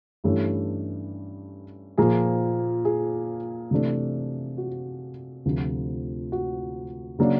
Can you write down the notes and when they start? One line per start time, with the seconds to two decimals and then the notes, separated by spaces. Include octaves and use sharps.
0.24 G2 E3 A3 C#4 G4
1.98 A#2 F3 A#3 G#4
2.85 G#4
3.71 C3 E3 A3 D4
4.58 F#4
5.46 D2 C3 F3
6.32 F#4
7.19 C#3 F#3 A#3 D4